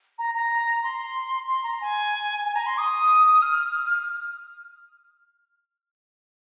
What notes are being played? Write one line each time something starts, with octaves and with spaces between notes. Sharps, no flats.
A#5
A#5
C6
C6
A#5
G#5
G#5
A#5
C6
D#6
F6